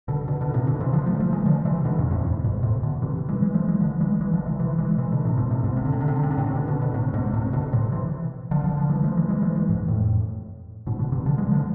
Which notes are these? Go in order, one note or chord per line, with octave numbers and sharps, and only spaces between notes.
B2 D3
B2 D3
B2 D3
A2 C3
B2 D3
C3 E3
D3 F3
F3 A3
F3 A3
E3 G#3
D3 F3
C3 E3
B2 D3
E2 G#2
F2 A2
F2 A2
G#2 B2
A2 C3
B2 D3
C3 E3
E3 G#3
E3 G#3
F3 A3
E3 G#3
D3 F3
E3 G#3
E3 G#3
D3 F3
C3 E3
C3 E3
E3 G#3
C3 E3
B2 D3
A2 C3
G#2 B2
A2 C3
G#2 B2
C3
D3
C3
D3
C3
D3
C3
D3
A2 C3
B2 D3
B2 D3
B2 D3
A2 C3
G#2 B2
A2 C3
B2 D3
A2 C3
C3 E3
D3 F3
D3 F3
D3 F3
E3 G#3
F3 A3
E3 G#3
E3 G#3
F3 A3
E3 G#3
G#2 B2
F2 A2
G#2 B2
B2 D3
C3 E3
D3 F3
E3 G#3
D3 F3